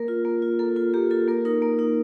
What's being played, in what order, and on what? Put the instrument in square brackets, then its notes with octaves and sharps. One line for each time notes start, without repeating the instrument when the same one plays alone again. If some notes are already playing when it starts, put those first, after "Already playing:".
Already playing: [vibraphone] A#3 A#4
F4
A#3
F4
A#3 A4
F4
A#3 G4
F4 A4
A#3 A#4
D#4 A#4
A#3
D#4